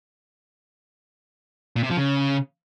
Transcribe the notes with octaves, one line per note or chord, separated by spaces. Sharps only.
A#2
C3
F3
C#3